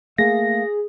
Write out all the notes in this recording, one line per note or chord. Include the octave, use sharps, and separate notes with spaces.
A3 A#3 G#4 F5 A#6